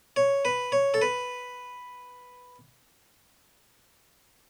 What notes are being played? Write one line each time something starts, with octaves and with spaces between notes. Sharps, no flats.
C#5
B4
C#5
A4
B4